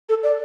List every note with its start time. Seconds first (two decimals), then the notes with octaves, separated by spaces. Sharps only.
0.09 A4
0.23 D5